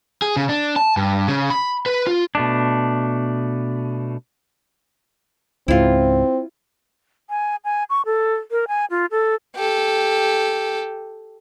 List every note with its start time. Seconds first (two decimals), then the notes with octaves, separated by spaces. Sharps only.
0.22 G#4
0.37 C#3
0.49 D4
0.76 A5
0.97 G2
1.28 C#3
1.50 B5
1.86 B4
2.07 F4
2.35 B2 A3 D4
5.68 C#2 G#2 C4 E4 F4
7.30 G#5
7.65 G#5
7.90 C#6
8.06 A4
8.51 A#4
8.68 G#5
8.90 F4
9.11 A4
9.56 G4 A4